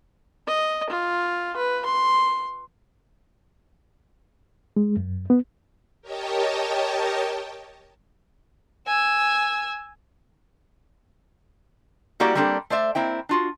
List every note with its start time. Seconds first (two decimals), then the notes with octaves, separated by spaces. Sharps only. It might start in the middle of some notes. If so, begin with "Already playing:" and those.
0.47 D#5
0.90 F4
1.57 B4
1.85 C6
4.76 G#3
4.97 F#2
5.30 B3
6.01 G4 A#4 C#5 D#5 G5 A5
8.87 G#5 E6
12.20 G3 A#3 E4 F#4 G4 D5
12.35 G3 A#3 C4 D4 G4 A4
12.70 A3 C5 D5 E5
12.95 A#3 C4 E4 G5
13.29 D4 F4 F#4